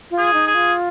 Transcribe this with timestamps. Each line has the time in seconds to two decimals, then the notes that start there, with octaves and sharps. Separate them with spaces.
0.11 F4
0.18 G#4
0.33 D#4
0.47 G#4
0.54 F4